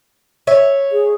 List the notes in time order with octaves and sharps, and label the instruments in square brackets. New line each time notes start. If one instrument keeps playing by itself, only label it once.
[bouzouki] C#5 E5
[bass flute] G#4